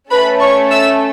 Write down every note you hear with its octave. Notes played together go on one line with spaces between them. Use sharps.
A3 C#4 A4 B4 B5
C#5 C#6
E5 E6